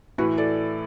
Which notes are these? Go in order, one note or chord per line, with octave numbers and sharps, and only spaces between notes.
A2 E3 F#4 B4
A4 D5